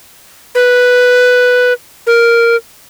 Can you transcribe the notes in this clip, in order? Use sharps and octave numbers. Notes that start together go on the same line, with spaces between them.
B4
A#4